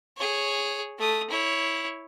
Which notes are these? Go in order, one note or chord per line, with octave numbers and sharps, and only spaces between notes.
G#4 C#5
A3 D#6
E4 C#5